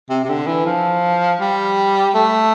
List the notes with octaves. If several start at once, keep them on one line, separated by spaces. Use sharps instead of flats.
C3
C3
D3
E3
F3
G3
A3